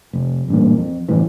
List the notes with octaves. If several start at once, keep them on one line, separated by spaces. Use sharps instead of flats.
F1
A1 G2 A#2
F2
G1 A2 E3